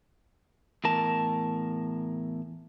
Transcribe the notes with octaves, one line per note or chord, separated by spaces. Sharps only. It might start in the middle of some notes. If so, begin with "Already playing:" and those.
E2 A2 A#4 A5